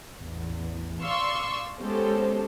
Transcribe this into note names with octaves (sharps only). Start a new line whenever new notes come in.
A1 E2
D5 F5 C6 C#6 E6
G#3 B3 C#4 G4 A4 C5